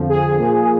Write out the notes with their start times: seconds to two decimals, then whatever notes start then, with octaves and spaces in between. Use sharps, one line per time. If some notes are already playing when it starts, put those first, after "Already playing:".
Already playing: F2 D3 F3
0.09 G#4
0.39 A#2 F3